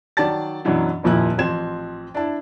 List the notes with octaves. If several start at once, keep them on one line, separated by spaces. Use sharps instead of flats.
D#3 F#3 D5 A5 A6
F#2 B2 E3 F#3 D4
D#1 F2 A#2 F3 E4 F#6
A1 F3 C4 G#6 E7
D4 E4 A5